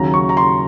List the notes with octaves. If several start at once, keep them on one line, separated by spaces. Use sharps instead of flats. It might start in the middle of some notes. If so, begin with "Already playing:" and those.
Already playing: D#2 C#3 F#3 A#5
C#6
A#5
C6